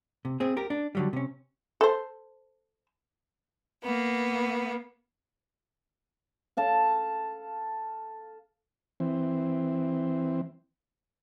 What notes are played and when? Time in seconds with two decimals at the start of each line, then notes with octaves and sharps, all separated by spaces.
0.25 C3
0.40 C4 G#4
0.57 G4 A#4
0.70 D4
0.95 D3 F#3 G3
1.13 C3 C#4
1.81 A4 C5
3.83 A#3 B3
6.57 A4 F5 A5
9.00 E3 C4